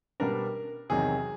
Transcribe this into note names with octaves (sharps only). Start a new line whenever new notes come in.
B2 G3 B3 D4 A#4
E2 C3 D#3 F#3 G#4